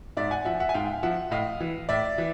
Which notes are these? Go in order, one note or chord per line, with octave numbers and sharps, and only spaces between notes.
G#2 D5 E5
F#5 G#5
F3 E5 F#5
E5 F#5
G#5
G#2 F5 G5
F3 E5 F#5
A2 D#5 F5
E3
A2 D5 E5
E3